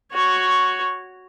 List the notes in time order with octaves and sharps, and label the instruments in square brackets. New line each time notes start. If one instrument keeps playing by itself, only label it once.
[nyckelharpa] F#4 C#5